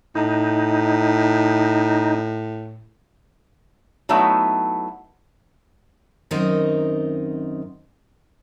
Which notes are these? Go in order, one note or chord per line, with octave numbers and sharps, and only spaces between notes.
A2 D#4
F#3 A3 B3 D#4 E4 E5
F#2 D#3 C4 D#4 A#4 D#5